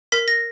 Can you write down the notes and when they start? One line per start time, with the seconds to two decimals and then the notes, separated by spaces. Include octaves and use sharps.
0.12 A#4 B6
0.28 A#6